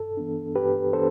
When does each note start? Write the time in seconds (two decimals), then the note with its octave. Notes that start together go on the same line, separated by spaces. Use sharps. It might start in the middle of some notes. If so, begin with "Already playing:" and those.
Already playing: G2 A4
0.17 E3 B3 D4
0.55 G2 G4 B4
0.93 E3 B3 D4 A4 C5